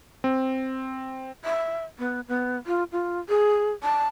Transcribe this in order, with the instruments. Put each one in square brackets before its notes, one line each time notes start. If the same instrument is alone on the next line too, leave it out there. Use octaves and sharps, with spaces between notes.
[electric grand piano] C4
[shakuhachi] E5
B3
B3
F4
F4
G#4
A5